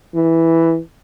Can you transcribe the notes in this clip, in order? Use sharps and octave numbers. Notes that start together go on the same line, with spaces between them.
E3